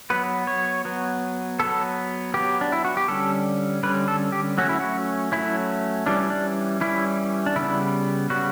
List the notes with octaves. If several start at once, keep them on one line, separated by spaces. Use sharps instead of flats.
F#3 B3 B4
C#5
F#3 B3
F#3 B3 A4
F#3 B3 G4
D4
E4
F#4
G4
D3 G3 C#4 A4
D3 G3 C#4 B4
A4
G4
F#3 A3 C#4 F#4
E4
F#4
F#3 A3 C#4 E4
E3 G3 C#4 D4
D4
E3 G3 C#4 E4
D4
C#3 G3 B3 E4
C#3 G3 B3 F#4